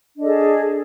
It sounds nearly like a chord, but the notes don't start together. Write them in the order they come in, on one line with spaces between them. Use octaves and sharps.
D4 D#5 A4 G#4